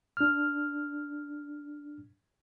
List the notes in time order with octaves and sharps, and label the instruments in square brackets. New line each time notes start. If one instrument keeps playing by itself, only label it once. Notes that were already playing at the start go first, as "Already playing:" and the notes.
[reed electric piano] D4 F6